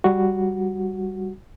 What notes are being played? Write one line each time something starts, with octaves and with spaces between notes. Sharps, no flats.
G3 F#4